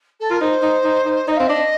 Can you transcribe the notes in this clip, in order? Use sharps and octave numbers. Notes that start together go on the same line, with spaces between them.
A4
F4 A#4
D#4 C5
D#4
D#4
D#4
D#4 D#5
C4 F5
D4 D#5